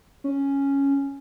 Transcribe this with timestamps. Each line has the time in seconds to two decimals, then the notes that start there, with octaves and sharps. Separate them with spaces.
0.24 C#4